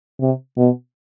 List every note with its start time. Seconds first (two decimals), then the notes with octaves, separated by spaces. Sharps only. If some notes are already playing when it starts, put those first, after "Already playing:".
0.20 C3
0.57 B2